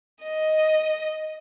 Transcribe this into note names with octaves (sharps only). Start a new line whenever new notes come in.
D#5